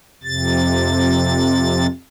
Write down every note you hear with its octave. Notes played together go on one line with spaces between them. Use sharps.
F2 C3 A6